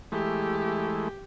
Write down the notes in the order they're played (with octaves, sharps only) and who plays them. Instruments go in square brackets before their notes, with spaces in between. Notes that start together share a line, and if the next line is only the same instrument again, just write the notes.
[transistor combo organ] E3 G#3 A3 [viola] G4